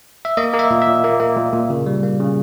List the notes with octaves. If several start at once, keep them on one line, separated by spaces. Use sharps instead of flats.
E5
A#3 D#5
A#3
E5
A#2
E5
A#2
A#3
A#3
A#2
A#2
C#3
G3
A#3
C#3